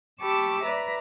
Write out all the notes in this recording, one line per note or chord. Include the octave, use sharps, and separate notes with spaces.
G4 A5 B5 C#6 D6 E6
B4 D5 E5 A#5